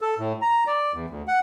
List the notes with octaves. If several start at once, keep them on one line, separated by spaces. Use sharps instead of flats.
A4
A2
A#5
D5
E2
D2
F#5